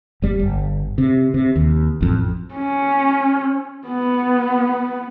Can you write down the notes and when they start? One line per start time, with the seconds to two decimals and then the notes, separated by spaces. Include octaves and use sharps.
0.22 F1 G3
0.39 G1
0.98 C3
1.34 C3
1.56 D#2
2.01 A1 F2
2.55 C#4
3.88 B3